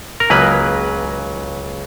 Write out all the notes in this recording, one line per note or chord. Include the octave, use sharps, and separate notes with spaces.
A#4
C#2 C#3 F#3 A#3 B4